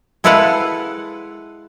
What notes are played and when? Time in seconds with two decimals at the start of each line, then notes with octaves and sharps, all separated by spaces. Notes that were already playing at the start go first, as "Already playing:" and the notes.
0.24 G#3 E4 A4 B4 F5 F#5